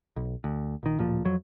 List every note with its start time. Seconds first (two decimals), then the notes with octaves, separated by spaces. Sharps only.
0.16 B1
0.44 D2
0.83 A#1 D#3
0.98 D1 A#2 F3
1.25 F2 F#3